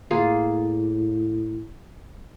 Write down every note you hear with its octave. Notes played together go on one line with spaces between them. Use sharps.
A2 A#3 F4 G#4